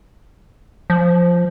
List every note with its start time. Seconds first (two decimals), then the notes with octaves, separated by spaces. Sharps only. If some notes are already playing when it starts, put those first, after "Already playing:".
0.90 F3